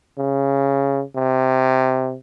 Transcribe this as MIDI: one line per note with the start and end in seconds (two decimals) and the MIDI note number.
0.18 1.03 49
1.16 2.15 48